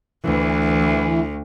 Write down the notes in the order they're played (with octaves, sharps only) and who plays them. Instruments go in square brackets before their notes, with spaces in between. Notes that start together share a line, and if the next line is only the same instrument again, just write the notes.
[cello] D2 [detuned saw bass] E3